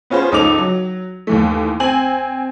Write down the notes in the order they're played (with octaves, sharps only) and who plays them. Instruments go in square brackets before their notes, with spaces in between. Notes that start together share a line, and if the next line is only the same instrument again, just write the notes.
[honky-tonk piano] B3 C#4 F4 G#4 C5
C#2 D#4 A4 D6 F7
F#3
D#2 E3 A3
C4 G#5 F#7